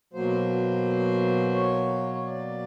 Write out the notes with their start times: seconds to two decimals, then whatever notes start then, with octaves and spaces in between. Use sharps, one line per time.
0.13 B2 F#3 A#3 C5
1.54 C#5
2.14 C#5
2.25 D5